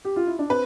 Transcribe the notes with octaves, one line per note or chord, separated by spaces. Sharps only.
G4
F4
E4
D4
C4 B4